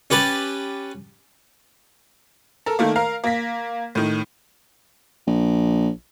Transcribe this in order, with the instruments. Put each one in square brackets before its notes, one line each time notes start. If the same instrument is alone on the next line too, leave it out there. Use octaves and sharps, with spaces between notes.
[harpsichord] C#4 G4 B4 A5
[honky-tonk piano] A4 A#4
D#3 A3 A#3
A#4 F5 A#5
A#3 A#6 B6
A2 D#3
[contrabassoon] A#1